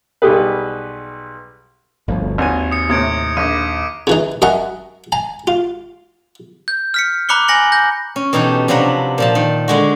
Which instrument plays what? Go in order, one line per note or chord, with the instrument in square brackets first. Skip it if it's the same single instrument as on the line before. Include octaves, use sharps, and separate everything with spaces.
[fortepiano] B1 G3 G4 G#4 B4
[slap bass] G1 D2 F3
[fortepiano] G#1 G#5 [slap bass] D#2
[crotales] D#6 C#7
[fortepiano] A2 C3 [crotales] D#6 G#6 D7
[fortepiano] A#1 [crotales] D6 D#7
[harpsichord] C#3 E3 D#4
F#2 D#5 E5 F#5 G#5 A#5
G#5 A#5
F4
[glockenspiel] G6
F6 B6 C#7
A#5 B5 D6 F#6 C#7 G7
G#5 A#6 C#7 F#7
G6 A#6
[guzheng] C#4
B2 E3 D#4 G4 A4
C3 F3 F#3 D4 B4 A#5
A#2 F3 A5
D#3
D3 G#3 F#4